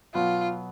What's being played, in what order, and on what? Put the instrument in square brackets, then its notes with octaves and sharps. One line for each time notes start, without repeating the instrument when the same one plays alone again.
[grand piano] B2 F#3 B3 [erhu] F4